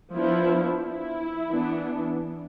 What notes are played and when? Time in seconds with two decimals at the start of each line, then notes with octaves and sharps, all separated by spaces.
0.13 F3 B3 D4 E4
0.83 E4
1.52 E3 B3 D4